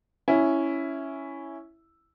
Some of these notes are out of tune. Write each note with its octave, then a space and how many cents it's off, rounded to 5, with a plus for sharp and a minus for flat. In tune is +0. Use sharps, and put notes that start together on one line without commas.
C#4 +0 E4 +0